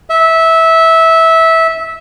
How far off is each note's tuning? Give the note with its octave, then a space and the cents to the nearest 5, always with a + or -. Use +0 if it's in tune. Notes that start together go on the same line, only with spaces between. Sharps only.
E5 -15